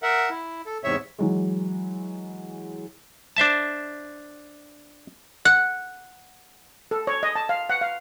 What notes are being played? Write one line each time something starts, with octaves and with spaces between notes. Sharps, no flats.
A#4 E5 F#5
E4
A4
E2 G#2 C3 C#5 E5
E3 F#3 G#3
D4 C5 E5 A5
F#5
A4
C#5
D#5
A5
F5
F#5
F5